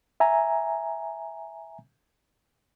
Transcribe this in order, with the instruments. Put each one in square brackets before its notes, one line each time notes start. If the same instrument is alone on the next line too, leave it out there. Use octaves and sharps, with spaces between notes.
[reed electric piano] E5 G#5 A#5